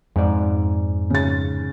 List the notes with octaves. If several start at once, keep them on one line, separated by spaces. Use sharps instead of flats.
F2 G#2 D5
C#3 A6